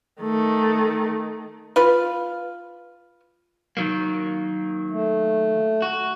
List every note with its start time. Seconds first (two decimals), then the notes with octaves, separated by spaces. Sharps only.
0.22 D#3 A3
1.76 F4 B4 F5
3.77 D#3 F#3 A#3
4.90 A3
5.82 F#4